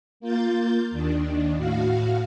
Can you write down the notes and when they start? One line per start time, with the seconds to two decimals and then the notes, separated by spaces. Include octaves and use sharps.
0.20 A#3 F4 G6 A6
0.91 D#2 D#3 D4
1.56 A2 F#4 F5